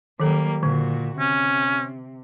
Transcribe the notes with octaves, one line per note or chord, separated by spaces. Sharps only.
D#3 F#3 G3 A#3 A4
A#2 D3 F#4
C3 C#4